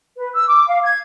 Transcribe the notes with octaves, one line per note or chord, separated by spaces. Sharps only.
B4
E6
D6
F5
G#6